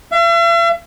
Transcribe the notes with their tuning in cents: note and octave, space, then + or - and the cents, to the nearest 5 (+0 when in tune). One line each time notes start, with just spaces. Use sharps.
E5 +45